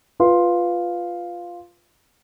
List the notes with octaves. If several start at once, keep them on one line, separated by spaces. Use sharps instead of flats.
F4 B4 F5 C6